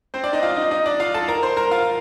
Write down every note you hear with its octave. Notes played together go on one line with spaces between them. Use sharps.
C4 C5
D4 D5
D#4 D#5
F4 F5
D#4 D#5
D#4 D#5
D4 D5
F4 F5
A4 A5
A#4 A#5
C5 C6
A#4 A#5
F4 F5